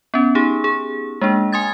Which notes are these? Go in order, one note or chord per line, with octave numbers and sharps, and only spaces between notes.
B3 C#4
D#4 G4 G#4
G#4
G#3 A#3 D4
G#5 C6 D#6 G#6 A6